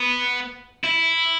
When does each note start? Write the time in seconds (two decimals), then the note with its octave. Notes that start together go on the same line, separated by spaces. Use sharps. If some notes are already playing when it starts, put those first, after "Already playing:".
Already playing: B3
0.84 E4